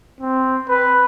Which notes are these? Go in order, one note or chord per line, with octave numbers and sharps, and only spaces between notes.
C4
B4